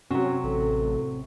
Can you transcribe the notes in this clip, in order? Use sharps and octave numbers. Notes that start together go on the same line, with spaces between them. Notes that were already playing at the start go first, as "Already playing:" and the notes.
C3 F#3 C#4 F#4
A1 A4